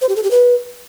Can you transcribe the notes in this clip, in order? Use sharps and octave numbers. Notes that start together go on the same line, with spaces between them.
C5
G4
A4
G4
B4